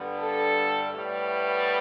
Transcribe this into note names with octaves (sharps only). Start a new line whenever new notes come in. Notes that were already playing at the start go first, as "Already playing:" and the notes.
Already playing: G2 D3 G3 B3
A4
A2 G3 B3